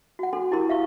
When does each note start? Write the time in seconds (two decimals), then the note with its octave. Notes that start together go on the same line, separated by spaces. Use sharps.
0.19 F#4 F#5
0.33 D4 A4 C6
0.51 D4 E4 G4 A#4 C6
0.69 E5 F5 C#6